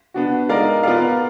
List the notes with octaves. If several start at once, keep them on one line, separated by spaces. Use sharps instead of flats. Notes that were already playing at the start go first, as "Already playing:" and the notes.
B3 D4 F#4
G#3 D#4 A#4 D5 F5
B3 F4 A#4 D5 F5